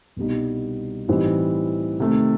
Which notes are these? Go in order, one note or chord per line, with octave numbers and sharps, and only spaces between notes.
C2 B2 G3 D#4
A2 E3 G3 C4 D#4
C3 D#3 A3